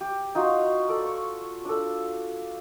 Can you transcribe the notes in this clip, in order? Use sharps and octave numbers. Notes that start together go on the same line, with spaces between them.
G4
D#4 F4 F#4
A4 D5
C#6
D4 A4